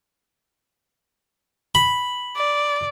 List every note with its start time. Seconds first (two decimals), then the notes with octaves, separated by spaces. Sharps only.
1.75 B5
2.36 D5